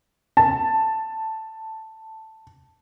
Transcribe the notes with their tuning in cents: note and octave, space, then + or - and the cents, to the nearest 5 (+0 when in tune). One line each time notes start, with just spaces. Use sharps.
A5 +5